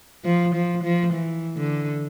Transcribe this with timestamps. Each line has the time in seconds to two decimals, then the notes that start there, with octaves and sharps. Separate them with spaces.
0.25 F3
0.54 F3
0.83 F3
1.13 E3
1.57 D3